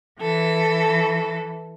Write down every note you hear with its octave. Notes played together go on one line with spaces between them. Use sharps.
E3 A4